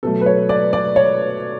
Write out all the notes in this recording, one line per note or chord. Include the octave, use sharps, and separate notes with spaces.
B2 F#3 A3 A4
B4
C#5
D5
D5
C#5